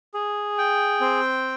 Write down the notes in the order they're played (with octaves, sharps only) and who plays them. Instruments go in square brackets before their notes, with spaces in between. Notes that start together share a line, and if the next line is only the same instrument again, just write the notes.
[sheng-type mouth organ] G#4
G5
C4